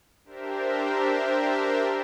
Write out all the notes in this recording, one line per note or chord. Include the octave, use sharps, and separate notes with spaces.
D4 G4 A#4 C5 E5